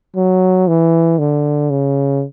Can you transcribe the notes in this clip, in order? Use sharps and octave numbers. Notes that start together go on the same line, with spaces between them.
F#3
E3
D3
C#3